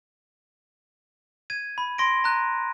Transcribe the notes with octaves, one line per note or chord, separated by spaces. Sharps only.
G#6 D#7
B5
C6 A#6 D7
A#5 F#6 D#7